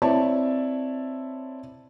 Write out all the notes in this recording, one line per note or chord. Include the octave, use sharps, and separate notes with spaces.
C4 E4 C#5 D5 E5 A5